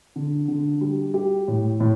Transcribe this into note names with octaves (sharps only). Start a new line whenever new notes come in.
D3
D3
G3
G4
A2
A2